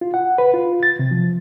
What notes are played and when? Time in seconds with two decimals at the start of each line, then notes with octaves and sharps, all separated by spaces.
0.01 F4
0.14 F#5
0.38 B4
0.54 F4
0.83 A6
0.99 C3
1.11 F3